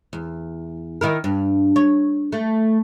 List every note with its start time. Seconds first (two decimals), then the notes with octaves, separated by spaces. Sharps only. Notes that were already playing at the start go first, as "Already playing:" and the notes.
0.13 E2
1.01 D#3 E4 A#4
1.24 G2
1.76 C#5
2.32 A3